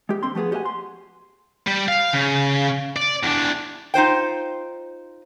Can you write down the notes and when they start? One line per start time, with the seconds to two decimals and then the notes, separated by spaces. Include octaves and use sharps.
0.09 G#3 G4
0.23 D3 C4 C6
0.35 F3 A3 B3 G#4
0.51 F#4 G4 C5 D#5 F#5 G#5
0.65 C6
1.67 G3
1.88 F5
2.13 C#3
2.96 D5
3.23 E2 D4
3.94 D#4 F4 C5 G5